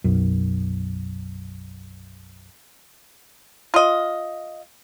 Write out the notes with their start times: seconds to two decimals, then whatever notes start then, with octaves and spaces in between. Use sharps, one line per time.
0.04 B1 F#2
3.74 F4 D#5